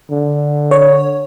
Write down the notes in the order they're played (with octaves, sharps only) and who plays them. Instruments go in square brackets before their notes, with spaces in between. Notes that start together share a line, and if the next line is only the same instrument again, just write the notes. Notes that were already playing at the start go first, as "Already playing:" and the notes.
[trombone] D3
[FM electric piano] C#5